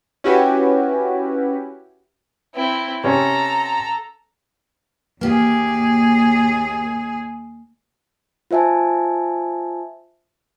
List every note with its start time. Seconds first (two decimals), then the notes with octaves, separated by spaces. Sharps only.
0.24 C#4 E4 F#4 G4 B4
2.55 C4 E4
3.04 C3 C#4 A4 A#5
5.21 D#2 A#3 G4 G#4
8.51 F4 C5 E5 G#5 A5